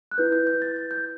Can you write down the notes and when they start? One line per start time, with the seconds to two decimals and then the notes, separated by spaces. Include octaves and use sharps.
0.11 F#6
0.18 E4 B4 G6
0.32 G6
0.47 G6
0.62 A6
0.76 A6
0.91 G6